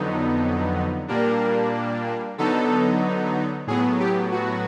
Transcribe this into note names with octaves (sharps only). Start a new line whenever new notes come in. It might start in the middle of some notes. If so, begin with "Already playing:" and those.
Already playing: F2 D3 F#3 B3 D#4
A#2 G3 A#3 D4 A#4
D3 F#3 B3 D#4 A4
A2 F#3 B3 G#4
G4
F#4